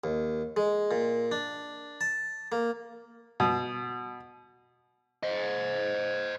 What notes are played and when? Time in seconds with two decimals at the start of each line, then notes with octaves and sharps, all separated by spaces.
0.04 D#2
0.57 G#3
0.91 A#2
1.32 D4
2.01 A5
2.52 A#3
3.40 B2
5.23 C5 D#5